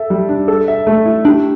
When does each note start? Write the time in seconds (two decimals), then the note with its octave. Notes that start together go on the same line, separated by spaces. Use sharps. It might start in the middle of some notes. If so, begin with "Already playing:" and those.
Already playing: A4 E5
0.10 G3
0.29 D4
0.48 A4
0.68 E5
0.87 A3
1.06 E4
1.25 D4 G4